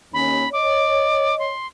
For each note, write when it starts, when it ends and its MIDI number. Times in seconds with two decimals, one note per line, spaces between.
0.14 0.44 39
0.14 0.44 61
0.14 0.49 83
0.53 1.51 73
0.53 1.51 75
0.53 1.37 86
1.39 1.67 84